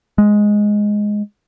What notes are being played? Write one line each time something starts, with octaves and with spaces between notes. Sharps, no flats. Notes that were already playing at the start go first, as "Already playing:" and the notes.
G#3